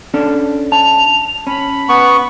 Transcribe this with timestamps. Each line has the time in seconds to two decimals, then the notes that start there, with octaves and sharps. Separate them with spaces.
0.14 C#4 D4 A4
0.72 A5 F7
1.47 C#4 B5
1.89 B3 C#6